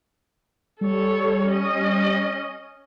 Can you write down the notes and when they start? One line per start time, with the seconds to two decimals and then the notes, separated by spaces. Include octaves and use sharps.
0.81 G3 A4 C#5
1.49 C#4 D#5